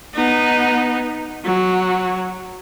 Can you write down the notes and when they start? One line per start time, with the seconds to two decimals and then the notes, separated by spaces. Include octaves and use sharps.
0.14 B3 D#4
1.44 F#3